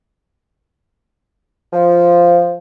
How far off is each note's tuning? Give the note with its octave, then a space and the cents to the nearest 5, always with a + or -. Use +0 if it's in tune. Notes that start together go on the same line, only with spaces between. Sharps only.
F3 -5